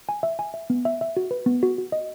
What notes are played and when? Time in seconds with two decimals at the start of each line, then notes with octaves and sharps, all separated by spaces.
0.09 G#5
0.23 E5
0.39 G#5
0.54 E5
0.70 B3
0.85 E5
1.01 E5
1.17 F#4
1.31 B4
1.46 B3
1.63 F#4
1.78 F#4
1.92 D#5